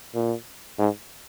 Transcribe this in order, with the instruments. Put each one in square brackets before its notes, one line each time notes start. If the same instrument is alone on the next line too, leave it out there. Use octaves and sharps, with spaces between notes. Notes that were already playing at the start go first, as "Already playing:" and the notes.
[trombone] A#2
G#2